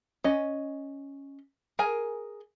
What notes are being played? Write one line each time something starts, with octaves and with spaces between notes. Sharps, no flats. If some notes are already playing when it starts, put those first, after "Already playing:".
C#4 D#5
G#4 A#4 G#5